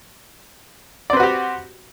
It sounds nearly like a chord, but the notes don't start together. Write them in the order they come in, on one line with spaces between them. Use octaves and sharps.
D5 C4 B4 F#4 G4